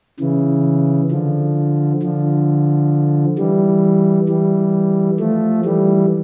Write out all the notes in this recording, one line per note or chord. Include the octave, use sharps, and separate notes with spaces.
C#3 E3
D3 F3
D3 F3
E3 G3
E3 G3
F3 A3
E3 G3